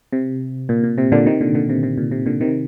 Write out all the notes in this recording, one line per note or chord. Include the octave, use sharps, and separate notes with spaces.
C3
A#2
A#2
C3
A#2 D3
C3 D#3
A#2 D3
A#2 D3
C3
C3
A#2
C3
A#2 D3
C3 D#3